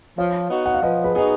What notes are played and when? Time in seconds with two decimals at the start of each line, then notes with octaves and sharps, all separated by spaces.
0.18 F3 C#5 F5
0.50 B3 D#4 F#4
0.66 F#5
0.74 F5
0.83 F3 B4 D#5
1.04 G#4 B4
1.15 B3 D#4 F#4 G#4